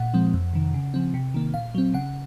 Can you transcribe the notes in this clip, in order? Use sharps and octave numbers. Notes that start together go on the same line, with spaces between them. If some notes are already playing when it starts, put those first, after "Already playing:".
Already playing: A#2 F#5
F3 G#3 C4
F2
C3 D#3
C#3
F3 C4
C3
D#3 A#3
A#2 F5
F#3 C4
C#3 F#5